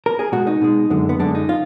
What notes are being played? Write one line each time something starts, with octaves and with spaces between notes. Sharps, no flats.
A#4
G#4
B2 G#3 F#4
D#4
B2 G#3
F#2 D3 G#3
B3
F#2 D3 G#3 D4
D#4
F4